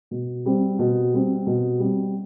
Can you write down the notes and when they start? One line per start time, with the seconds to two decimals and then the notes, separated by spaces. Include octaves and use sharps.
0.11 B2
0.46 G3 C4
0.79 B2
1.13 G3 C4
1.47 B2
1.79 G3 C4